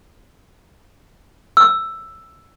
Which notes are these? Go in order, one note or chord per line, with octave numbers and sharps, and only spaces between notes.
E6